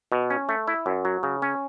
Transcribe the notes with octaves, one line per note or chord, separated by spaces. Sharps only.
B2
C#4
A3
E4
F#2
F#3
C#3
C#4